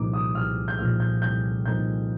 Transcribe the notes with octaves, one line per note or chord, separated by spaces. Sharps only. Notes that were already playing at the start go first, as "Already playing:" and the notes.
Already playing: C2 A#2 F3 A#3 D#4 D6
D#6
C2 F6
G6
A#2 F3 A#3 D#4 F6
G6
C2 G6
A#2 F3 A#3 D#4 G6